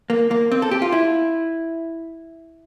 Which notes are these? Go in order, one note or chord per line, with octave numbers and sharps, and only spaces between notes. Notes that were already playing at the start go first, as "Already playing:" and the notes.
A#3
A#3
C4
A4
G4
F4
E4